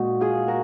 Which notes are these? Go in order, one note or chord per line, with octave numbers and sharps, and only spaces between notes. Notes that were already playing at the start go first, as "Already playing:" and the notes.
Already playing: A#2 G#3 D#4 F#4
F4 G#4
F#4 A#4